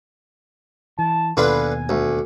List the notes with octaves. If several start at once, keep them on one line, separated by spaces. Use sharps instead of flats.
E3 A5
D#2 B2 D3 F4 B4 G#5
D2